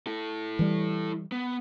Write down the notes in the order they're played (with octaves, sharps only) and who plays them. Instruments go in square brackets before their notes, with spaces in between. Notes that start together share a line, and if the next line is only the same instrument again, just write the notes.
[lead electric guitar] E4 A4
[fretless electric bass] E3 G3
[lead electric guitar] B3